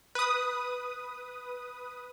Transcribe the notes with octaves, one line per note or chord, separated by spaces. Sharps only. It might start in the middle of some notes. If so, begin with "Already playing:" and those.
B4 D#6